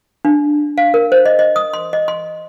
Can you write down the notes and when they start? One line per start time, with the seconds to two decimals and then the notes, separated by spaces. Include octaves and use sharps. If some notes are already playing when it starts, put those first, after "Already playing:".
0.25 D4
0.78 F5
0.94 A#4
1.12 C5
1.26 D#5
1.39 D#5
1.56 D#6
1.73 C6
1.93 D#5
2.08 C6